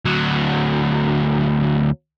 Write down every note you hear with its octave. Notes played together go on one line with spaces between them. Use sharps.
D2 F#3